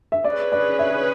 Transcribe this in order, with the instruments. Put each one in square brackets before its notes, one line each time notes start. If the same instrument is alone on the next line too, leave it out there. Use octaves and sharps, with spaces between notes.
[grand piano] E5
[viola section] C#4 G#4 B4 [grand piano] D5
[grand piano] D5
E5